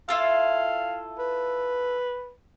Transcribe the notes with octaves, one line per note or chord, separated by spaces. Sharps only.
E4 F4 A4 F5
B4